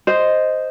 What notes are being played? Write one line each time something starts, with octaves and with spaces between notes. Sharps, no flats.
C5 D#5